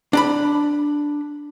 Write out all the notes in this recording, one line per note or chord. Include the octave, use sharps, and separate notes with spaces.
D4 A#5 B5